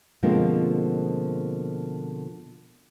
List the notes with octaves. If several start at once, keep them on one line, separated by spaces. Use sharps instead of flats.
B2 D3 F3 G#3 A#3 C4